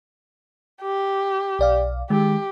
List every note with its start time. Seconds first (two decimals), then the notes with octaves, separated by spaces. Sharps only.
0.82 G4
1.59 B1 D5 F5
2.10 D#3 G#3 G4